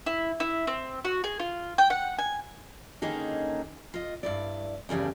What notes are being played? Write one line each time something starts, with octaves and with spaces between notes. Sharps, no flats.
E4
E4
C4
F#4
G#4
F4
G5
F#5
G#5
D3 D#3 A#3 C#4 D#4 G#4
F4 D#5
G2 E4 D5
E2 G2 C#3 G3 A3